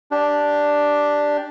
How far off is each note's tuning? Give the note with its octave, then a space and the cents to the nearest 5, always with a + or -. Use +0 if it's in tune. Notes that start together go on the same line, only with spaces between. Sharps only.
D4 +0 G4 +0